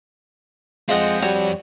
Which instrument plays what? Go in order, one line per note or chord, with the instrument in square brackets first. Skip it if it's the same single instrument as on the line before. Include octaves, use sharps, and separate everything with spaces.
[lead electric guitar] F2 C4 [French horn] G#3 [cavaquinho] F4 D#5 F#5
[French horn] G3 [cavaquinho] F#4 C#5